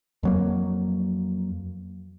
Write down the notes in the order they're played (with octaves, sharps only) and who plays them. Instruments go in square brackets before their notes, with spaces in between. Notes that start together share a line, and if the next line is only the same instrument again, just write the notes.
[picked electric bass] F2 F#3 A#3